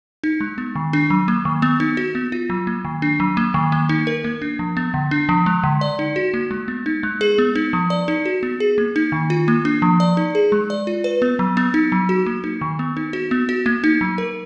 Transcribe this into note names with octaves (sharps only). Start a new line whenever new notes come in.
D#4
G#3
B3
D#3
D4
F#3
A#3
D#3
B3
D#4
F#4
B3
F4
F#3
A#3
D#3
D4
F#3
A#3
D#3
A#3
D#4
A#4
A#3
D4
F3
B3
D3
D4
F3
G#3
D3
D5
D#4
F#4
A#3
G#3
B3
D#4
G#3
G#4
B3
D#4
F3
D5
D#4
F#4
B3
G#4
A#3
D#4
D#3
F4
A#3
D4
F3
D5
D#4
G#4
G#3
D5
F4
B4
B3
F#3
B3
D#4
F#3
F#4
A#3
D#4
D#3
B3
D#4
F#4
B3
F#4
A#3
D#4
F#3
A#4